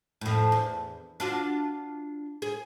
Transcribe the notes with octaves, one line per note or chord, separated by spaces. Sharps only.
F2 A2
E2
D4 F4 F#4
G#4